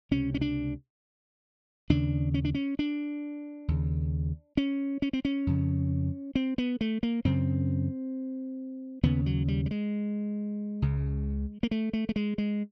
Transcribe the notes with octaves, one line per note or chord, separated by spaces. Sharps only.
C#2 C3 C#4
C#4
D4
D#2 C#3 D4
C#4
D4
C#4
D4
D#2 C#3
C#4
C#4
C4
C#4
F2 C#3
C4
B3
A3
A#3
F#2 C#3 C4
D#2 C#3 B3
F#3
G3
G3
G#3
C#2 C#3
A#3
A3
A3
A3
G#3
G#3